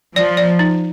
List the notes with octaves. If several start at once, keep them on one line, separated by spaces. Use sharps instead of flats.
F3 D5
D5
D#4